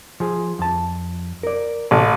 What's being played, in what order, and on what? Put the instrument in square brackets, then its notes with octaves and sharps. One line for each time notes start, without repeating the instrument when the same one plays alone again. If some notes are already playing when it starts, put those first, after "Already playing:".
[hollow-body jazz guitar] F3 G#4
F2 A5
A#4 D5
[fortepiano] A1 [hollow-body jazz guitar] C3